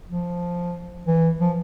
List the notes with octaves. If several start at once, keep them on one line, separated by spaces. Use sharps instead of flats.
F3
E3
F3